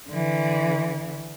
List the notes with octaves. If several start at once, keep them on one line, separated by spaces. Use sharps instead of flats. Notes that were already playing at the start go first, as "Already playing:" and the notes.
D3 E3